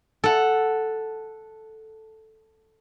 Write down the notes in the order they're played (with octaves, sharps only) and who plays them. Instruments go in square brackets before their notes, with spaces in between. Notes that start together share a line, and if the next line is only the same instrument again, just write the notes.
[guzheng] A4 F#5